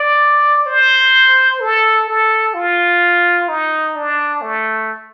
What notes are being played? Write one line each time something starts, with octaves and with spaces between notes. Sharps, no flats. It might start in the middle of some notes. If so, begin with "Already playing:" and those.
Already playing: D5
C5
A4
A4
F4
D#4
D4
A3